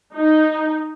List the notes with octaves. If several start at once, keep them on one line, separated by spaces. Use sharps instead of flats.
D#4